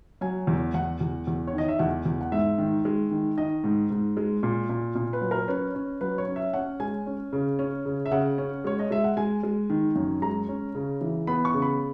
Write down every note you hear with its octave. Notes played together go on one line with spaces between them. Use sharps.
F#3 G#5
E2
E2 F#5
E2
E2
C#5
D#3 D#5
E5
E2 F#5
E2
F#5
G#2 E5
D#3
G#3
D#3
D#3 D#5
G#2
G#2
G#3
A#2
A#2
A#2
B4
F#3
A#4
C#4 B4
C#4
F#3 B4
C#5
C#4
E5
C#4 F#5
G#3 G#5
C#4
C#3
C#4
C#3
E5
C#3 F#5
C#4
G#3 C#5
D#5
G#3 E5
F#5
G#3 G#5
G#3
D#3
F#2
G#3 A#5
C#4
C#3
E3
B3 B5
C#6
C#3
B5